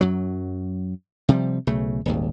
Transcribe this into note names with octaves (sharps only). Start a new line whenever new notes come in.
F#2 F#3
C3 F3 G3
B1 C#3 A3
D#1 G#1 D#2